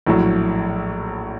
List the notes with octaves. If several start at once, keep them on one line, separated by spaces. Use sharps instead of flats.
A#1 A2 F#3